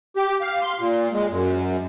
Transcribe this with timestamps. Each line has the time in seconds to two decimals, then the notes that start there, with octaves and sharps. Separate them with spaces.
0.17 G4
0.41 F5
0.62 C6
0.79 A#2
1.13 G#3
1.31 F#2